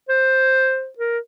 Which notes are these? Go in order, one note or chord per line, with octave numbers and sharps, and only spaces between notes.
C5
A#4